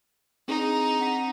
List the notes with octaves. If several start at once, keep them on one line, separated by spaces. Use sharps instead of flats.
C4 D4 D#4 G#4
C4 F#5 B6